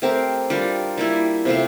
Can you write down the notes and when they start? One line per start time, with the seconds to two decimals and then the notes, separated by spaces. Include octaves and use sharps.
0.02 A3 C4 G4 A#4
0.50 G3 D4 F4 A#4
0.98 G3 A#3 E4
1.45 C3 F3 A3 C4